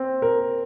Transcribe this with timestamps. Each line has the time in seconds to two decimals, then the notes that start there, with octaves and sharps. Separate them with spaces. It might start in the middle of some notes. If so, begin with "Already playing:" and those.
Already playing: C4
0.22 A#4